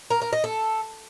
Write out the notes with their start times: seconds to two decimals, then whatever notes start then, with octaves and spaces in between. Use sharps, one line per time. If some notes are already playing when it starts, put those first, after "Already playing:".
0.10 A#4
0.22 A#4
0.33 D#5
0.44 A4